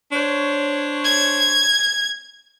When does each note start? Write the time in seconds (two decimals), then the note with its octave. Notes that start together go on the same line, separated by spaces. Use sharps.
0.12 D4 C5 C#5
1.04 G#6